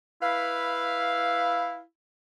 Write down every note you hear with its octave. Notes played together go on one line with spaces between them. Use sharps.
E4 B4 F5